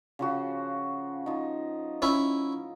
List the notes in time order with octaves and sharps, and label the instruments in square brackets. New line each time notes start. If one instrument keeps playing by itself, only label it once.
[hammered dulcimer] C#3 F3 F#4
F3 D#4
[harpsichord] C#4 E4